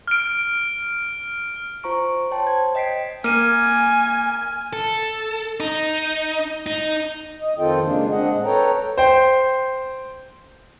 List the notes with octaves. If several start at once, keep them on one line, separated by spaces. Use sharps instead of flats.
F6 D7
F4 C5 A#5 C#6 D7
C5 C#5 G5 A5 C6
C5 G#6
D#5 G5 B6 C7 D7
A#3 G#5 F6 D#7
A4
D#4
D#4
D#5
F2 D#3 C4 F4 A4 G5
C#3 G#3 A#3 D4
G#3 C4 D4 D#5 F#5
A2
A4 B4 C#5 G5 A#5
C5 G5